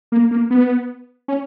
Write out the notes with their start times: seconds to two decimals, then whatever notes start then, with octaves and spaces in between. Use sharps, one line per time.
0.12 A#3
0.31 A#3
0.50 B3
1.28 C#4